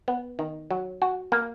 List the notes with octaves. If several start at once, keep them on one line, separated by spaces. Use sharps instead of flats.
B3
D#3
F#3
F#4
A#3